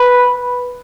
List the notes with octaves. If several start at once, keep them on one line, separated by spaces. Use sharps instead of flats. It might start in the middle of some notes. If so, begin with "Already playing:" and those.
Already playing: B4